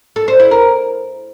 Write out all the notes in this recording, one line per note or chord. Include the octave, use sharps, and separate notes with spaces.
A4
C5
E4
A#4